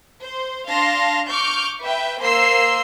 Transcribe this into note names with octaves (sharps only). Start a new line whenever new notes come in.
C5
D4 F5 A5 C6 A#6
C#6 D6 F6 G6
B4 E5 G5
A#3 C5 C6 E6 C7